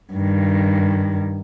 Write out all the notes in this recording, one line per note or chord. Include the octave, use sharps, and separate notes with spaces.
G2 D#3